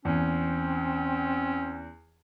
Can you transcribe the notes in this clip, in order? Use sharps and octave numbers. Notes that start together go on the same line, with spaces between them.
E2 C4 C#4